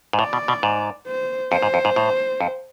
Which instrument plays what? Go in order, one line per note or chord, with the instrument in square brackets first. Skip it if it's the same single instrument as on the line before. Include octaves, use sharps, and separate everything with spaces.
[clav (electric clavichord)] G#2
[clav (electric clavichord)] A2 [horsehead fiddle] D5
[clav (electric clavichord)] B2
B2
G#2
[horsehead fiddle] C5
[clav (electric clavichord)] F2 [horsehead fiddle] C5
[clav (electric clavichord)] G#2
F2
G#2
A2
F2